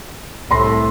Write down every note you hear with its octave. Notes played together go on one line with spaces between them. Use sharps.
C2 A2 B5 C6 A#6